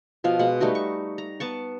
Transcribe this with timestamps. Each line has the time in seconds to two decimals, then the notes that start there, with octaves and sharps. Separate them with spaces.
0.24 B2 F3 F5
0.39 B2 G#3 F#5
0.60 G3 A3 D#4 F#4
0.75 C#6
1.18 A#5
1.40 B3 A5 C#6